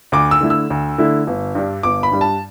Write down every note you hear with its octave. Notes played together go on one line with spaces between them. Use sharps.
D2 D6
E6
D3 A3 E4
E6
D2
D3 A3 E4
G1
G2 G3 D4
G1 D6
B5
G2 G3 D4
A5